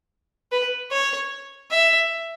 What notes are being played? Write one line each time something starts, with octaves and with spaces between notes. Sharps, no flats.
B4
C#5
E5